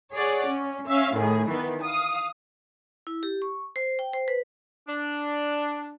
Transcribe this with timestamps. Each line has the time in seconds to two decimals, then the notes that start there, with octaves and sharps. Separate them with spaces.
0.13 G#4 C#5 D5 F#5
0.48 C#4
0.88 C#4 E5 F5
1.16 A2 D#3 G#4
1.49 D#3 E3 B3
1.83 F5 D#6
3.07 E4
3.23 G4
3.42 C#6
3.76 C5
3.99 G5
4.14 C5
4.28 B4
4.88 D4